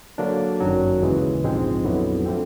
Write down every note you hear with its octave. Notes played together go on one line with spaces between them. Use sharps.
D3 F#3 A#3 D4
G1 F#2 D#3 F#3
D#2 C#3 E3 G#3
A#1 G#2 F3 G#3 C4
F2 D3 F#3 B3 E4
D3 F3 A3 C4